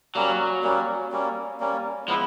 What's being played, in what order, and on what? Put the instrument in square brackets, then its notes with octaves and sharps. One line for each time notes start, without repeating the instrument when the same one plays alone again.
[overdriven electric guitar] F#3 [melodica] G3 A#3 C#4
[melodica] G3 A#3 C#4
G3 A#3 C#4
G3 A#3 C#4
[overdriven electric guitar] F3 [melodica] G#3 B3 E4